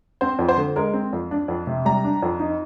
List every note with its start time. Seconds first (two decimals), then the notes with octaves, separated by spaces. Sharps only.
0.21 C4 C5
0.39 F2
0.48 C5
0.57 D3
0.76 G#3 A#4
0.94 C4
1.13 F2
1.31 D4
1.48 F2
1.67 C3
1.85 G3 A#5
2.04 D4
2.22 F2
2.40 D#4